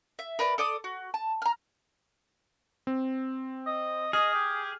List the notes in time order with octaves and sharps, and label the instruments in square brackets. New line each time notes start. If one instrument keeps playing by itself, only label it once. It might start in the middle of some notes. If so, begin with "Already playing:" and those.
[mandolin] E5
A#4 B4 D5
A4 D5 D6 D#6
F#4
A5
A#5 F6
[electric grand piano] C4
[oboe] D#5
[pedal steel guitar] G#4 [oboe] D#5 [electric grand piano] F6
[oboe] G4